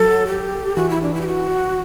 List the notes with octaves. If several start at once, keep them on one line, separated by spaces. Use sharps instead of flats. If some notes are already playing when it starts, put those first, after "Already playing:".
Already playing: F#3 A4
G4
E3 F#4
E4
D4
E4
G4
F#4